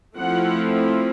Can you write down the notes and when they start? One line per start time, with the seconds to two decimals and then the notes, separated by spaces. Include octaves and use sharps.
0.18 F3 A3 C4 E4 F#5